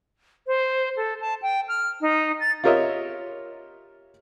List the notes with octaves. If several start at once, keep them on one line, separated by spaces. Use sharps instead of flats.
C5
A4
A5
G5
F6
D#4
A6
F4 G4 A#4 C#5 D#5 E5